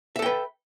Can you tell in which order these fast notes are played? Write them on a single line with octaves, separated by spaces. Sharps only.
E5 A4 G5 B4